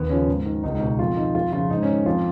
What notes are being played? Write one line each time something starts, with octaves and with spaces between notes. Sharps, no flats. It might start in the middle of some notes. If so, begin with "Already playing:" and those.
Already playing: D#2 B3
C#3 F3 C#4
G#2
D#3
C#2 D#4
D#4
B2
D#4
F2 F4
D#3 D#4
F2 F4
C#3 F3 F4
G#2 D#4
C#4
D#3
F2 F4